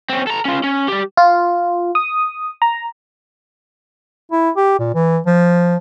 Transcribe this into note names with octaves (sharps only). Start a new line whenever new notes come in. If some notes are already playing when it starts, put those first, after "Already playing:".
C4 C#4
A4 A#5
C#4 F4
C#4
G3 G4
F4
D#6
A#5
E4
G4
A#2
E3
F3